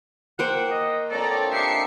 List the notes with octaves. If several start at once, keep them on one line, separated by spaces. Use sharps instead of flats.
A#3 C5 F#5 G5
D#5
A#2 D3 C4 A4 C#5 D5 A#5
D4 D#4 G4 E5 A#5 C7 C#7